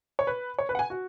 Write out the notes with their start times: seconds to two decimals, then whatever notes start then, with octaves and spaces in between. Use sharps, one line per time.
0.19 C#5
0.27 B4
0.59 C#5
0.69 B4
0.75 F#5
0.79 G#5
0.90 F#4